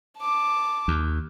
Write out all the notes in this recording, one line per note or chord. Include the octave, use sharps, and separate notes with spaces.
A5 D6
D#2